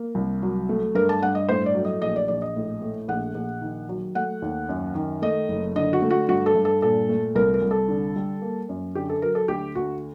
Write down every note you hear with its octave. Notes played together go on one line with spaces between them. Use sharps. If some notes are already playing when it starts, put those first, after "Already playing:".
Already playing: A#3
C2
F#3
A3
G2 A#4
A5
G2 F#5
D#5
A2 C5
D5
F#3
D#5
A#1 D#5
D5
A#1 D5
D#5
A2
A3
A#1 F#5
A#1
D#3
F#3
A3 F#5
D#2
F#2
D#3
A3 D#5
F#1
D3 D#5
F#4
A3
F#4
G2 F#4
A4
G2
A4
A#2 A4
A3
C2 A#4
A#4
C2
A4
D3
G3
A#3
F#2
D3 G4
A4
F#3 A#4
A4
D2 G4
D2 F#4